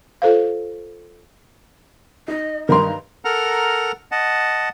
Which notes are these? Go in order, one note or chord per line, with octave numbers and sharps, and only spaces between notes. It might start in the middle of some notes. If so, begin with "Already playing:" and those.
F4 A4 C5 F5
D#4 D#5
G2 D#3 A#4 A#5 C6
A4 A#4 F#5 A#5 F6
D#5 F#5 A5